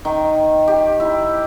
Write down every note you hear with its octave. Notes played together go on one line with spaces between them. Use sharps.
D#3
G4
E4